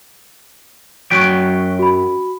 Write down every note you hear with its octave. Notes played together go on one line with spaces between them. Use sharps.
F#2 F#3 G5 C#6 F#6 B6
F#4 B5